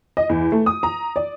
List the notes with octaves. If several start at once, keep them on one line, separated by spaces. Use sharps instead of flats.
D#5
E2
A3
D#6
A#5
D5